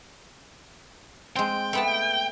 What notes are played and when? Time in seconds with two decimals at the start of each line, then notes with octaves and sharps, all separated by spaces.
1.36 G#3 C4 G5
1.73 A3 B3 A5